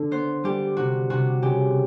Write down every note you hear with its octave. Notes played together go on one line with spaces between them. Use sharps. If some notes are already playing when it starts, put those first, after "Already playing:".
Already playing: D3
B3 C5
G3 G4
C3 F#4
C3 F#4
C#3 G4